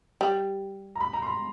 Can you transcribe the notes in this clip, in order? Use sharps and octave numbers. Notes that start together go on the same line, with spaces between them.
G3
A#5
B5
A#5
C6
B5